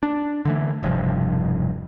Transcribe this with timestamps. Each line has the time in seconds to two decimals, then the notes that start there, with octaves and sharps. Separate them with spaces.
0.03 D4
0.45 D3 E3 A3
0.83 E1 G2 C3 F3